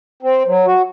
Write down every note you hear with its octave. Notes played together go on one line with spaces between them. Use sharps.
C4
F#3
F#4